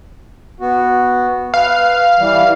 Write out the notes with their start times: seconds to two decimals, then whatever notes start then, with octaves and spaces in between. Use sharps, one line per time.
0.60 B3 F#4
1.54 B4 F5
2.19 E3 G3